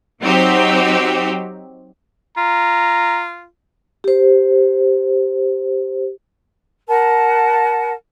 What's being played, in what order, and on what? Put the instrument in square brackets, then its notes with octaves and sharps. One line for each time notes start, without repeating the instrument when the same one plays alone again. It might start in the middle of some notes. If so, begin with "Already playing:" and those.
[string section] F#3 C4 D#4 F#4 G4
[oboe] F4 [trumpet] A#5
[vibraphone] G4 C5
[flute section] A#4 F#5 A5